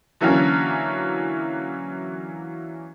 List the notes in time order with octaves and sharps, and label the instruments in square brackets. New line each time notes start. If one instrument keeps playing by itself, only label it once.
[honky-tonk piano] D3 E3 F#3 A#3 C#4